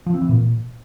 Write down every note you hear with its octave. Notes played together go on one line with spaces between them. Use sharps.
F3
C4
E3
A#2